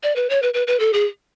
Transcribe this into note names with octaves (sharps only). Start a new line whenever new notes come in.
D5
B4
C#5
B4
B4
B4
A4
G#4